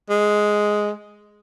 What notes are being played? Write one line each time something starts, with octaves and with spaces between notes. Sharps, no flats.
G#3